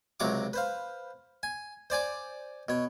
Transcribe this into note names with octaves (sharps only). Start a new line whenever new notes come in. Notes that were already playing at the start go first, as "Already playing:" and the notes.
C#2 C3 F#3 A#5 C#6 D6
B4 C5 F5
G#5
C5 D5 G#5 D6
B2 C#5